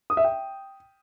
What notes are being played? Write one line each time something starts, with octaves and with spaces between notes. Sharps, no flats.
D#6
E5
G5